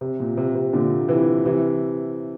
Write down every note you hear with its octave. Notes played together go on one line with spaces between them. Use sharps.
C3
A#2
C3
C3
A#2 D3
C3 E3
C3 E3